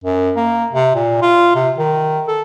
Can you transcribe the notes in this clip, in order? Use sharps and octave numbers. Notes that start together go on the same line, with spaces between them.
F#2
A#3
C3
A#2
F4
C3
D#3
A4